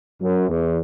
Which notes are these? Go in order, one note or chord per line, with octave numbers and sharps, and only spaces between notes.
F#2
E2